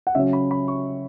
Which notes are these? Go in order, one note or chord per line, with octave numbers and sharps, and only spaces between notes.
F#5
C#3 F#3 C#4 E5
B5
B5
C#6